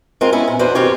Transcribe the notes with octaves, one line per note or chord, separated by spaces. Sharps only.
G#3 C4 F4 A#4
B3 C#4 E4
A#2
E2 D4 F#4 B4 C5
F#2 B2 D#3 C4 G4 C#5